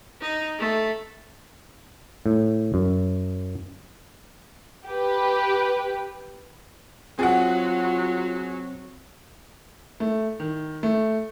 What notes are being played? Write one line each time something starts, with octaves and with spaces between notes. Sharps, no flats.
D#4
A3
A2
F#2
G4 B4
F#3 C4 F4 F#4 G#4 F#5
A3
D#3
A3